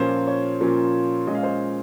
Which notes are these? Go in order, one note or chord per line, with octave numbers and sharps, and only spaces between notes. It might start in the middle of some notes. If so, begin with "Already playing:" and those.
Already playing: A#2 F3 A#3 C#4 C5
C#5
A#2 F3 A#3 C#4
A#2 G#3 C#4 D#5
F5
C5 D#5